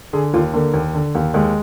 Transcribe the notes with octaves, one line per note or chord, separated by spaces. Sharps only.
D3 G#4
D#2 F4
D3 A#3
D#2
D3
D#2
D#2 G#3